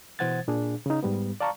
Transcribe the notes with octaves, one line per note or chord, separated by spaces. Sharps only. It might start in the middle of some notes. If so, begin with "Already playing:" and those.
B2 E3 C5 F#5 G#6 A6
A#2 D4 G#4
C#3 D#4
G#2 G3 B3
D5 F5 A5 A#5 C#6